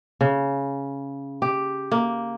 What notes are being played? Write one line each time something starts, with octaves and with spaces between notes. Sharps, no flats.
C#3
G4
A#3